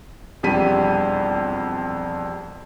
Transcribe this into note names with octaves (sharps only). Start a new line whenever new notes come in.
E1 F2 G3 B6 D#7